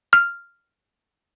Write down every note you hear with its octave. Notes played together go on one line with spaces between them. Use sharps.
F6